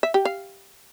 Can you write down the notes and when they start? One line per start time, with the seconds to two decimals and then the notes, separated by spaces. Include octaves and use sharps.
0.03 E5
0.14 G4
0.25 F5